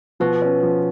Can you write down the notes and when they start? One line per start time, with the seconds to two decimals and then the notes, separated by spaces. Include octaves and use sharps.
0.20 B2 F3
0.42 C#4
0.63 F3